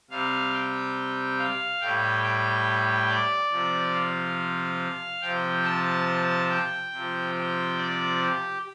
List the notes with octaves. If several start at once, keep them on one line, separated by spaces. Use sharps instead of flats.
C3 G3 F5
G5
F5
A2 G3 G5
G5
D5
C3 F3
F5
C3 F3 G5
A5
G5
C3 F3
G5
D5
G4